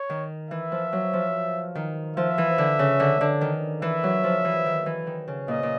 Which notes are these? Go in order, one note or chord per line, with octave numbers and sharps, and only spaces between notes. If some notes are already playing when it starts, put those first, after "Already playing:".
Already playing: C#5
D#3
E3 E5
F3
F#3
F3
D#3
F3 E5
E3
D3
C#3
D3
D3
D#3
E3 E5
F#3
F3
E3
D#3
E3
D#3
C#3
A#2 D#5
A#2